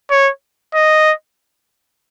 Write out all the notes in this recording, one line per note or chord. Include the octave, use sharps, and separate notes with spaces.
C#5
D#5